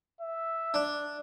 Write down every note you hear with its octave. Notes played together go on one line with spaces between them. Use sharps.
E5
D4